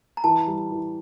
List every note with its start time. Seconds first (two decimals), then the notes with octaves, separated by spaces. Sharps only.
0.17 A#5
0.24 E3 A5
0.47 G3
0.71 E3